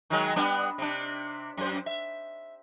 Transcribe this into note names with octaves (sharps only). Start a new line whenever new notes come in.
D#3 F#3 G#3
G3 B3 D4
C3 D4
F#2 C5
E5